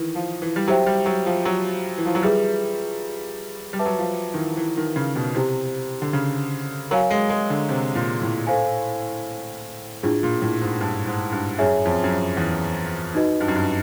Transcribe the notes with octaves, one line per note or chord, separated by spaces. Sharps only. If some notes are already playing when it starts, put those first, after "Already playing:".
Already playing: D#3 E3
F3
E3
G3
F#3 E4 G4 C5 E5 G5
G3
F#3
F3
F#3
E3
F3
F#3
G3 F4 G#4 B4 E5
G3
B4 E5 A5 D6
F#3
F3
D#3
E3
E3
D#3
C#3
B2
C3 E4 G4 C5
D3
C#3
F#3 A#4 C#5 F5 G#5
G#3
G#3
D3
C3
A#2
A2
A4 C5 F5 G#5
A2 D4 F4 G#4
A#2
A2
G#2
G2
G#2
G2
F#2 E4 G#4 C#5 E5 G#5
F2
F#2
F2
E2
D#4 F#4 B4 D#5
G2
F#2
G2